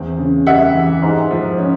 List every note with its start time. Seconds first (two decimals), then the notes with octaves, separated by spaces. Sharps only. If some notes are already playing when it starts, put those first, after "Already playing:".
Already playing: E2 C4
0.18 C#3
0.46 G3 E5 F#5
0.75 E3
1.02 G#2
1.31 F3
1.58 C#4